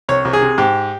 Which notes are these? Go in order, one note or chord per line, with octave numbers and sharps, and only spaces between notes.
C2 C#5
C2
G#4
C3
G#2 G4